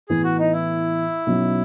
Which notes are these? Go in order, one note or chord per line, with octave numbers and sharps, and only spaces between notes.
A2 E3 B3 G#4
F#4
D#4
E4
B1 B2 F#3 C#4